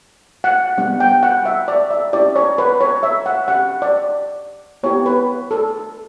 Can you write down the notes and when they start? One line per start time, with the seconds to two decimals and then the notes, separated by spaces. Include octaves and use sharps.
0.44 F#5
0.78 G3 B3 D4 F#5
1.00 G5
1.23 F#5
1.46 E5
1.68 D5
1.91 E5
2.13 C#4 E4 G4 D5
2.36 C#5
2.58 B4
2.81 C#5
3.03 E5
3.26 F#5
3.48 C#4 G4 F#5
3.82 D5
4.83 B3 E4 G4 C#5
5.06 B4
5.51 A4